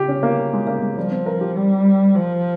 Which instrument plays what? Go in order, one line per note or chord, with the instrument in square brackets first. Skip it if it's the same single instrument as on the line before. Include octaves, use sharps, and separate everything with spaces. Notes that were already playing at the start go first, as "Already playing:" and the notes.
Already playing: [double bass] C#3 [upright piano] G4
[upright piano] C#4
A#3
G#3
A#3
G#3
[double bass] F3 [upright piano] G3
[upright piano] C4
A#4
G4
[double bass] G3
F3